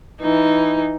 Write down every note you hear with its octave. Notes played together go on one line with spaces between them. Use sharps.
E3 D#4